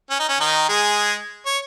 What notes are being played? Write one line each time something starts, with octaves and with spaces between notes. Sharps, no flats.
C#4
D#4
C#4
D#3 D#4
G#3 G#4
C#5